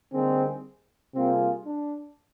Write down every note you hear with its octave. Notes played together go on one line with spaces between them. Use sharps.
D3 G3 A#3 C4 D#4 G#4
C3 G3 A#3 C4 F4 G#4
D4